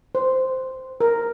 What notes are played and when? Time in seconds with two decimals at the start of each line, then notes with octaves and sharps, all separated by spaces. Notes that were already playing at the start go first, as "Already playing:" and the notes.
0.15 C5
1.01 A#4